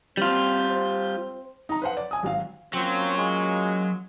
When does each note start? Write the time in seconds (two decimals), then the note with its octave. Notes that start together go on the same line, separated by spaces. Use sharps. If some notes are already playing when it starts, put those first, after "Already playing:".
0.17 G3 C4 F4
0.70 C4 C5
1.69 D#4 A#5
1.82 B4 C5 F#5
1.97 D5
2.11 G#5 D#6
2.23 G#1 F#3 F#4 F5
2.74 F#3 A#3 C4 C#4 F4
3.17 G#3